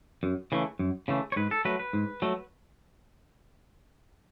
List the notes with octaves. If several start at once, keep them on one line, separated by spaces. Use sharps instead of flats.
F#2
C#3 E3 A3
F#2
C#3 E3 A3
C#5
G#2 B4
A4
F#3 A3 B4
B4
G#2
F#3 A3